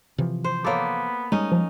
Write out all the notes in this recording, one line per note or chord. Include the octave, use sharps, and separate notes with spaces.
C3 E3 F3
C5
A#3 B3 A4 C#5 D6
G3 G#3 C#4 D#4
F3